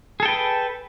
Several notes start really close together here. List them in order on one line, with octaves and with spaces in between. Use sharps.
G#4 A4 G5 B4